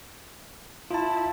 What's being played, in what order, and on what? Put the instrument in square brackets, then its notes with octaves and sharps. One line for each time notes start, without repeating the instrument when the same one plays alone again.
[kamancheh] E4 [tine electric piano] F4 A5